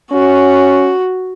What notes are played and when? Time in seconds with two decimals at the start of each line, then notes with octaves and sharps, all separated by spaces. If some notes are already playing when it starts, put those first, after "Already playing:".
0.12 C#4 F#4